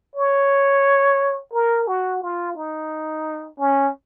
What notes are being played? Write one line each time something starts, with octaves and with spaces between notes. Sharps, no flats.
C#5
A#4
F#4
F4
D#4
C#4